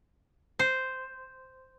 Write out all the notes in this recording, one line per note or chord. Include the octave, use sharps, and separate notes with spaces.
C5